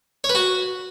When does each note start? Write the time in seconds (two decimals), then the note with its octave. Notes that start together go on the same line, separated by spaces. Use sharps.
0.24 C#5
0.30 B4
0.35 F#4